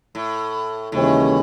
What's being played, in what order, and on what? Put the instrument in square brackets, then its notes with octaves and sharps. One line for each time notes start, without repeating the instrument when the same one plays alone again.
[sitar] A2
[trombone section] D#2 C#3 E3 G#3 C#4 [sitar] A2